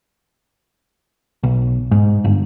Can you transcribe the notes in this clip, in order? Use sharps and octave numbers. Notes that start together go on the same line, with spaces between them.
B1
G#2
G1